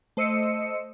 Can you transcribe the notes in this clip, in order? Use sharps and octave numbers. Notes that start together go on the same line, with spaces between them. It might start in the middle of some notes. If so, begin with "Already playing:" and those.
A3 C5 D#5 E6 C#7